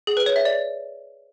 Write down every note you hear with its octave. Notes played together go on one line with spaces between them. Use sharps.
G#4
B4
C#5
E5
D5